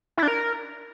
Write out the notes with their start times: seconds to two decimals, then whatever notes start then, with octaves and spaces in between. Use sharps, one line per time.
0.17 E4
0.23 D4
0.28 A#4